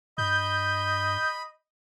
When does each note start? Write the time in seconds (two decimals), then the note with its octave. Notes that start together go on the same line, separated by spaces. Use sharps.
0.18 G2 D#5 B5 G6